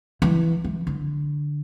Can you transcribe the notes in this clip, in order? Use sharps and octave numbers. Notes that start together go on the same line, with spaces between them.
E3
E3
D3